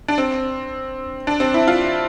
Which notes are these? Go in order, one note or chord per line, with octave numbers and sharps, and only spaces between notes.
D4
C4
D4
C4
E4
F4